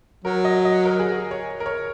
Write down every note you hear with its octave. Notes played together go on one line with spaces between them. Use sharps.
F#3 A#4
D#5
D#5
A#4
G#4
C#5
A#4
C#5